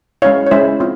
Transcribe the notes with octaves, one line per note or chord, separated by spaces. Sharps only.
G#3 C#4 E4 C#5 F5
C#5
G#3 C#4 E4 C5 E5
C4 F4